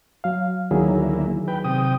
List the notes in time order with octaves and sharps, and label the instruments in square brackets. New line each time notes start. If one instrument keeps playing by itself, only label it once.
[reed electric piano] F#3 F5
[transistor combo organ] D2 A#3 E4 [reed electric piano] D#3 F#3 G#4
[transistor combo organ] B4 G5
C3 G5 D#6